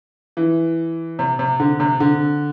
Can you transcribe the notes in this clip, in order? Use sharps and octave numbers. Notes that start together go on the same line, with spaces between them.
E3
C3
C3
D3
C3
D3